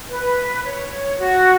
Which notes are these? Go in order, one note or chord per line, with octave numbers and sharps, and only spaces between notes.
B4
C#5
F#4